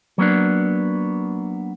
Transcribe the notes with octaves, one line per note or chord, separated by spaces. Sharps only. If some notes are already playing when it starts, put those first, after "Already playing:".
F#3 A#3 B3 D4